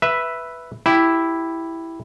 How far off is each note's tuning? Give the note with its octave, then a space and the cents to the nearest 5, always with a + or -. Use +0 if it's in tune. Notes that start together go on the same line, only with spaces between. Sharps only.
B4 +0 E5 +0
E4 +0 G4 +0